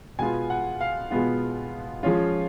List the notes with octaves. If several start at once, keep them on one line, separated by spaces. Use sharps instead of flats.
B2 G#3 B3 F4 G#5
F#5
F5
B2 G#3 B3 F4
F3 G#3 C#4 F4